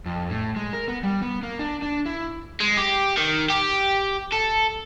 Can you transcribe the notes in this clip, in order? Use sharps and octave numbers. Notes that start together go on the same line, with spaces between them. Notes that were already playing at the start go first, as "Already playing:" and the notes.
F2
A2
G#3
A#4
B3
G3
B3
A#3
D4
D4
E4
G#3
G4
D#3
G4
A4